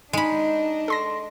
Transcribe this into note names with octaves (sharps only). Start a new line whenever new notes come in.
G#3 D4 D#4 D#5 B5
A4 C6 A#6